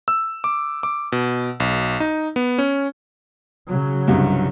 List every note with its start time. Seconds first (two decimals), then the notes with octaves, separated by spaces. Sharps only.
0.08 E6
0.44 D6
0.83 D6
1.12 B2
1.60 B1
2.00 D#4
2.36 B3
2.58 C#4
3.69 C#3 F#3
4.07 C2 G2